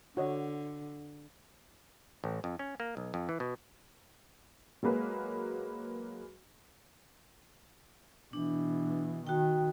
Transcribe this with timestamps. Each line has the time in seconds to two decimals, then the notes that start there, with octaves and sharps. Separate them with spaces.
0.17 D3 F#4 C#5 D#5
2.24 A1
2.44 F2
2.59 C#4
2.80 A#3
2.97 B1
3.14 F2
3.29 E3
3.40 B2
4.83 F#3 G#3 A#3 B4
8.33 B2 E3 D4
9.27 D#3 F#4 G5